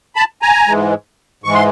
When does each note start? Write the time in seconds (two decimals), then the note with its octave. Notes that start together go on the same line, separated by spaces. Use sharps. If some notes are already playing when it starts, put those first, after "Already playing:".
0.16 A5 B5
0.42 G#5 A#5
0.67 G#2 E3 G#3
1.44 G#2 E3 G#3 C#6
1.54 C6